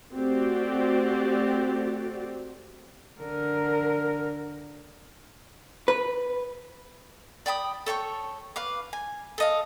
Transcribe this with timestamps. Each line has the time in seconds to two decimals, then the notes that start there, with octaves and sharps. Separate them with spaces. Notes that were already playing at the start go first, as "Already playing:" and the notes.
0.16 A3 C4 F#4 G4 D5
3.20 D3 A#4
5.88 B4
7.46 D5 G5 B5 D#6
7.86 A4 C#5 G5 C#6
8.56 B4 F5 D6
8.93 G#5
9.38 A4 D#5 F5